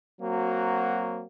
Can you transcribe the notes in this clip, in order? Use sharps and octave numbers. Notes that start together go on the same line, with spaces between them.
F#3 A#3 C4 F#4